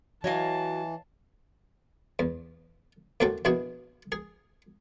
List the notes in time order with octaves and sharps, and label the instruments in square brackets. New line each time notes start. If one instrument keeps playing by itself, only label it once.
[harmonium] E3 [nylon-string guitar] F#3 [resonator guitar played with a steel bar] C#5 D#5 F5 [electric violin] A5
[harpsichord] E2
D#2 A2 C4 F#4 A4 G5
A#1 B2 E4 F#4 G#4
G#4